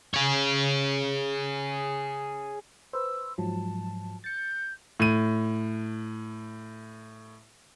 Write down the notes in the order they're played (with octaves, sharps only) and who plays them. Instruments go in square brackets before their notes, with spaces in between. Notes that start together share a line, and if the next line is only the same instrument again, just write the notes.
[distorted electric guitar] G#4 C#5
[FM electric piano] B4 C5 [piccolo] E6
[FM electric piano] G#2 F3 F#3 [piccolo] A5
[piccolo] G6 [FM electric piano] A6 C#7
[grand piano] A2 D#7